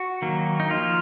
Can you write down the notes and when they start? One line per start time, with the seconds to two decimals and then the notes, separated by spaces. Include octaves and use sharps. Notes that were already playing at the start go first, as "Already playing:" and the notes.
Already playing: F#4
0.22 D#3 F#3 A#3
0.60 D#4
0.70 F3 A#3 F4